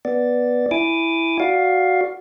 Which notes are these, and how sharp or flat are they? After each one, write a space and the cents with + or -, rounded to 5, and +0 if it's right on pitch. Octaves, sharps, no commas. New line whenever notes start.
B3 -5 D5 +0
E4 +0 G#5 +0 D6 +0
F#4 +0 D5 +0 F5 +10